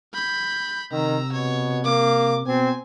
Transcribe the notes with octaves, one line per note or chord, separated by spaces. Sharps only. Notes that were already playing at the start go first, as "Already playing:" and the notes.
B5 G6
C3 D#3 A#5 E6
B2 C#5
A#3 D6
B2 C4 G#5